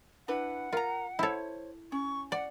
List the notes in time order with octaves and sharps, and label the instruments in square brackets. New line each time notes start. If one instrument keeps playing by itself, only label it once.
[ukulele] D4 E4 B4 [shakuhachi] F#5
[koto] F4 [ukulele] A#4 A#5
[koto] E4 A4 [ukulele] C5 C#5
[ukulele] C#4 [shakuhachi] C#6
[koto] D5 [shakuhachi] F#5